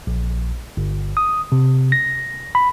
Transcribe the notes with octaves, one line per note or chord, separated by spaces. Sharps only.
A#1
G1
D#6
C3
A#6
B5